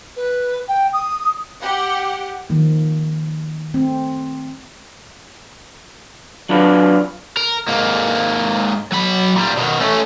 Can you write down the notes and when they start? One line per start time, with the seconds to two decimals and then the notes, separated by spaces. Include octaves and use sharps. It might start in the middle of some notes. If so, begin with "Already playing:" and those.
0.16 B4
0.67 G5
0.93 D#6
1.62 G4 F#5
2.50 D#3 F3 A#3
3.74 A3 C4
6.49 F#3 D4 F4 B4
7.37 A#4
7.68 G#2 A#3
8.92 F#3 B5
9.36 A#2 G3
9.57 B2 D#3
9.80 A3 C#4